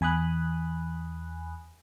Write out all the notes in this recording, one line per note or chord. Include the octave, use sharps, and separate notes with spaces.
E2 G#5 B5 D#6 F#6